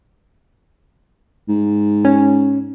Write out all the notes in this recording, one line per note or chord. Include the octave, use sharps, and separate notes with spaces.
G#2
C#4